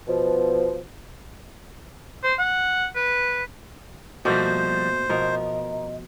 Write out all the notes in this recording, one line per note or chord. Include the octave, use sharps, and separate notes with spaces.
B2 F3
C5
F#5
B4
B2 F3 G3 A3 A#3 F#4 C5
B2 F3 B3 A#4 D#5